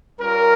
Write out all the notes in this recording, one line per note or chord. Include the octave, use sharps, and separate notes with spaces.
G3 C#4 F4 A#4